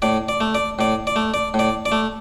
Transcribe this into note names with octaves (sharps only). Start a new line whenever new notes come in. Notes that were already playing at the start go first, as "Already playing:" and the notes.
A2 D5
D5
A3
D5
A2 D5
D5
A3
D5
A2
D5
D5
A3